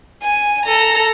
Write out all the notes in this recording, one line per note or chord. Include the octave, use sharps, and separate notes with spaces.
G#5
A4 A#5